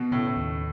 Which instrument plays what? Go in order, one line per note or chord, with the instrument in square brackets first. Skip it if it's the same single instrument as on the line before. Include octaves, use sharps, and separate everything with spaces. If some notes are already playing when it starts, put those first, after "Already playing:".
Already playing: [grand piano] B2 [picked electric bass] B3
[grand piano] A2 [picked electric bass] C#3
[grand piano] A2
[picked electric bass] D#2